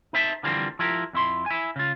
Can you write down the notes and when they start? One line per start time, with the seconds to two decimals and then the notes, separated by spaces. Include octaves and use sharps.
0.13 D#4 C5 E5 G5 A5
0.43 D3 E3 F3 G3 A#3 C4
0.79 F3 E4 G4 A#4
1.13 F2 E4 C6
1.46 E4 G#5
1.76 C#3 F4